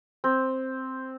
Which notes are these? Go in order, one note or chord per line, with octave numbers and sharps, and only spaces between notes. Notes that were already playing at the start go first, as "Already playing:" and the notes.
C4